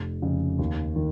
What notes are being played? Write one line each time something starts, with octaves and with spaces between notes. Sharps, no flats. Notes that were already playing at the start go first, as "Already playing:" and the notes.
Already playing: F1
F2 C#3
D#2
D#3